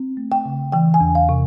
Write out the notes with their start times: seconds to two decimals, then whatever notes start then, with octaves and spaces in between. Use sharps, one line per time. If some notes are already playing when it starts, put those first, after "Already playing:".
Already playing: C4
0.17 A3
0.32 G5
0.45 C#3
0.72 E3 G5
0.94 G#5
1.01 E2
1.15 F5
1.29 C3